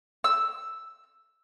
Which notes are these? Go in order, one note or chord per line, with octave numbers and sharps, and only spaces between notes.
E6